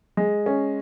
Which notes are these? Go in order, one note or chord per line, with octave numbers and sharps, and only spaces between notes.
G#3
C#4